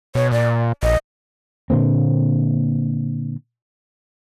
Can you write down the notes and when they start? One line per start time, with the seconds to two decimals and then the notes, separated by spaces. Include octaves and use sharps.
0.15 B2 C#5
0.32 A#2 D5
0.83 A#1 D#5
1.70 A#2 D3 A#3 C4